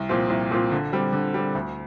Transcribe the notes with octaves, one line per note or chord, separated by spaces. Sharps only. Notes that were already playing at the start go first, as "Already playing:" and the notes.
Already playing: C2
A#2 F3 C4 F4
C2
A#2 F3 C4 F4
D3
G3 C4
D3
G3 C4
D2